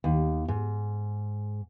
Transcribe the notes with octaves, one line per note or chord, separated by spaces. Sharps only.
D#2
G#2